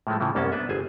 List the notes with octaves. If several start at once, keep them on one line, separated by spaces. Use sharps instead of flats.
A2 F3 G#3 A3
A2 C#3 E3 F3
C2 F#2 A#3 B3 C#4 A5
B3 D4 B4 E5
G1 G#4 C5 G#5